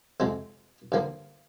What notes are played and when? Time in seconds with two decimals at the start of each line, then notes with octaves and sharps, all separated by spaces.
0.20 F2 C3 F3 G#3 C4
0.92 G2 D3 F3 A#3